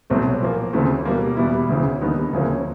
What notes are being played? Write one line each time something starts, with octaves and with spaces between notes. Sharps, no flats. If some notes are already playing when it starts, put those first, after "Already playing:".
C2 B2 F#3 A3 C4
A#2 F3 A#3
D2 C#3 E3 A3 C4
B2 G3 A#3
E2 B2 G3 B3 E4
D2 C#3 E3
D#2 D3 G3 B3 D#4
D2 C#3 F3 A#3 C#4